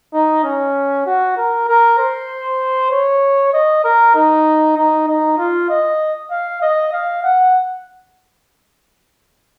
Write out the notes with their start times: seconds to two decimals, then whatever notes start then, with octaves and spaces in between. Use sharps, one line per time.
0.14 D#4
0.44 C#4
1.07 F#4
1.37 A#4
1.68 A#4
1.99 C5
2.91 C#5
3.53 D#5
3.84 A#4
4.15 D#4
4.77 D#4
5.08 D#4
5.38 F4
5.70 D#5
6.31 F5
6.62 D#5
6.93 F5
7.24 F#5